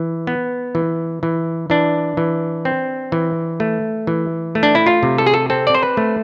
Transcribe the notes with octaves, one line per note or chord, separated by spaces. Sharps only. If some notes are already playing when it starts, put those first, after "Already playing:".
Already playing: E3
B3
E3
E3
E3 D4
E3
C4
E3
A3
E3
A3
D4
E4
F4
C3
A4
G#4
A4
C4 A4
D5
C5
B4
A3